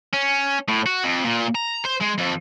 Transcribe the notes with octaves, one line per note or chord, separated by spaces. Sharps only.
C#4
A2
F#4
F2
A#2
A#5
C5
G#3
F2